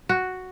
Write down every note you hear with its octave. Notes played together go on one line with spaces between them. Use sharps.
F#4